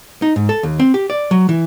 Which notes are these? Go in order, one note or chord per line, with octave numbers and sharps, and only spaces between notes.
D#4
G#2
A4
D#2
C4
G4
D5
F#3
E3